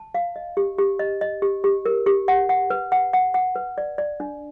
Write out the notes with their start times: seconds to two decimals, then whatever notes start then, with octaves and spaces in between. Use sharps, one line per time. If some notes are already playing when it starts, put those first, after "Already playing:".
Already playing: A5
0.15 F5
0.36 D#5
0.57 G4
0.78 G4
0.99 D#5
1.21 D#5
1.42 G4
1.64 G4
1.86 A#4
2.06 G4
2.28 F#5
2.49 F#5
2.70 B4
2.92 F#5
3.13 F#5
3.34 F#5
3.56 B4
3.78 D5
3.98 D5
4.20 D4